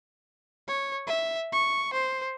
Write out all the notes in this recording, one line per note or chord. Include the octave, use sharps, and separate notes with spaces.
C#5
E5
C#6
C5